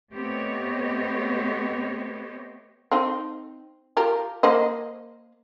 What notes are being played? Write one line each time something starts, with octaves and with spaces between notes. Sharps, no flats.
A3 B3 C4 G4 C#5 D#5
C4 D#4
F4 G4 A#4
A#3 C5 D#5